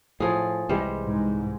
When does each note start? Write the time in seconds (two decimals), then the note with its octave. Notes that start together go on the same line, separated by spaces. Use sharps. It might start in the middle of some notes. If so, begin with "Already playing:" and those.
0.20 A2 F3 G#4
0.69 C2 E3 G3 G#3 C5
1.03 G#2